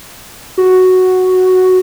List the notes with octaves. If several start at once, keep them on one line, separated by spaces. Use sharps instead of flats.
F#4